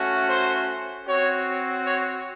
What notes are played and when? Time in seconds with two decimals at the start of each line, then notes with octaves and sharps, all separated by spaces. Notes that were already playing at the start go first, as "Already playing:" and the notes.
Already playing: A3 C#4 F#4
0.29 C5
1.07 C4 F#4 C#5
1.85 C#5